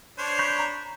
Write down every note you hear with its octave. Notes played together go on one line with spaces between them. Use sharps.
D4 C5 C#5
B5 C#6 G6
A#5